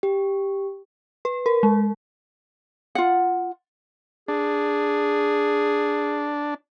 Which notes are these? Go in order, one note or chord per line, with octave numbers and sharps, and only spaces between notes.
G4
B4
A#4
G#3
F4 F#5
D4 G#4